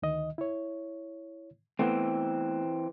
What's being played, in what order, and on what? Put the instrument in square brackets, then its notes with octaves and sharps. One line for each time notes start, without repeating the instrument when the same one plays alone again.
[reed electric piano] D2 D#3 D#5
E4 C#5
[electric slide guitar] E3 C4 [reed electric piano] A3 B3